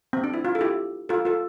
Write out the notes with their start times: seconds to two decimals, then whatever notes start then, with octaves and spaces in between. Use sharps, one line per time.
0.13 C4
0.24 D4
0.34 E4
0.45 F4
0.55 A4
0.61 E4 G4
1.09 F4 A4
1.25 F4 A4